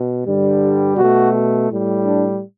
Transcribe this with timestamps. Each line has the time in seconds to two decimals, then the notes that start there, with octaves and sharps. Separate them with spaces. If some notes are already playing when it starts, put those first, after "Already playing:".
Already playing: B2
0.26 G2 D3 G3
0.97 B2 A3 F#4
1.69 A2 G3
2.05 D4